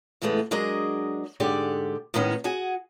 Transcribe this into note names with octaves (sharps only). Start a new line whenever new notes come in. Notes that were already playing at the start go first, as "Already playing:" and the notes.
A2 C#3 E3 G#3 A3 B3
F#3 G#3 D4 G#4 A#4 D#5
G#2 D3 G#3 G4 D5
A2 D#3 G#3 B3 C#4 D#4
F#4 G#4 F#5 G#5